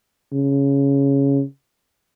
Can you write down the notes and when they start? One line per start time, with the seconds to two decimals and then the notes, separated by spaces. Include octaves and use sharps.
0.33 C#3